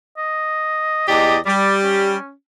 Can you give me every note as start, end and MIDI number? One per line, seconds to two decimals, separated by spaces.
0.18 1.04 75
1.08 1.37 40
1.08 1.37 67
1.08 1.38 74
1.08 1.37 75
1.46 2.15 55
1.46 1.76 74
1.83 2.32 61